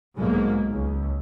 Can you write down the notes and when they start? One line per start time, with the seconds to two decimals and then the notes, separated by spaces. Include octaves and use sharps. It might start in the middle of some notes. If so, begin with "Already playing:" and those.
0.16 B1 G#2 G#3 A#3
0.72 C#2